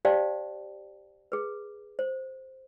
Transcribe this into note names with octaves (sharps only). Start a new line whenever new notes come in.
G4 C5 D5 F5 G5 A5
G#4 B4
C5